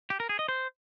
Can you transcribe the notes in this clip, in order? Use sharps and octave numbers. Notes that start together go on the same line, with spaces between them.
G4
A#4
G#4
D#5
C5